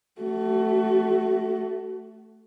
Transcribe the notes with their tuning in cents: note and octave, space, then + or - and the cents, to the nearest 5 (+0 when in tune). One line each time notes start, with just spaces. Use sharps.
A3 +0 F#4 +35